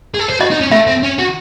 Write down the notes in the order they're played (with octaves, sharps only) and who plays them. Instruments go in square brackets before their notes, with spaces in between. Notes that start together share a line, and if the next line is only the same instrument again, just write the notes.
[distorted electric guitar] G#4
A4
C5
[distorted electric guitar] F#4 [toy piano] D#5
[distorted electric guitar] D#4
C#4
[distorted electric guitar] A3 [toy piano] E5
[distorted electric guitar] C4
C#4
F#4